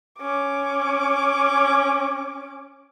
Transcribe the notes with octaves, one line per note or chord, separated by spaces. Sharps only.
C#4 D6